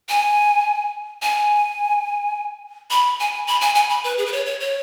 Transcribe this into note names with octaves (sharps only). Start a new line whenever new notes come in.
G#5
G#5
B5
G#5
B5
G#5
G#5
B5
B4
G#4
B4
C#5
C#5
C#5